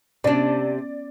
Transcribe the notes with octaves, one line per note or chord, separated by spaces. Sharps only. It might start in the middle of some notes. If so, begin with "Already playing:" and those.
C3 B3 C#4 D4 D5